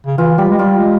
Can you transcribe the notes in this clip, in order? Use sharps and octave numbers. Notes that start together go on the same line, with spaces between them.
C#3
E3 F4
G3 G4
G#3
G3 F4
G#3